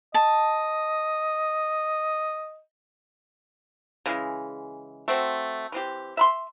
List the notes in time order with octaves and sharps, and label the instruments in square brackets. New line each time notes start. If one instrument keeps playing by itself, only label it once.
[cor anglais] D#5 [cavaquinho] A5
[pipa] C#3 E3 G#3
A3 C4 F#4
E3 C4 G4
E5 B5 C6